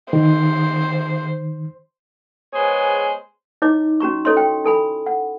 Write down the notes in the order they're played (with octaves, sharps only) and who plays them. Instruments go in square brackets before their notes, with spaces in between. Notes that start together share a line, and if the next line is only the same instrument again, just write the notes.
[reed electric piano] D#3 [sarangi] C5
[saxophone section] G#3 B3 G#4 C5 C#5
[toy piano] D#4 E4 C#5 D#5 D6
C#4 F#4 A#5 C#6
E4 A4 C#5 D#5 C6
G5
E4 A4 G#5 B5
F#5